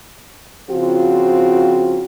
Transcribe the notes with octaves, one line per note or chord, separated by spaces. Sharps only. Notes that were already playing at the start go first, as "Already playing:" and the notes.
C#3 F3 C4 F4 F#4